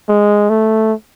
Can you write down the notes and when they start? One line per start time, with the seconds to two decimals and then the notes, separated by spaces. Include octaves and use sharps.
0.09 G#3
0.49 A3